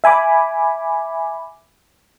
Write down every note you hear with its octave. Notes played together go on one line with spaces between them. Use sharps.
E5 G#5 B5 D6